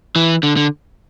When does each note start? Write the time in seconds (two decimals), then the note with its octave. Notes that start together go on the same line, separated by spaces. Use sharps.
0.16 E3
0.43 D3
0.57 D3